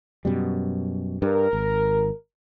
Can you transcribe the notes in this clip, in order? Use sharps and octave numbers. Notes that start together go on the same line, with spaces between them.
F#2 B2 G3
G2 A#4
G#1